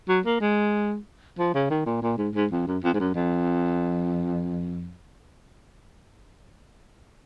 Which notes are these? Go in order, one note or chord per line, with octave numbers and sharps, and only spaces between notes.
F#3
A#3
G#3
F3
C#3
D#3
A#2
A#2
G#2
G#2
F2
F#2
F2
G#2
F#2
F2